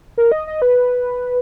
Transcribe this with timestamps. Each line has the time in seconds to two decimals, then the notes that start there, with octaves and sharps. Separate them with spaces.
0.18 A#4
0.32 D#5
0.47 D#5
0.62 B4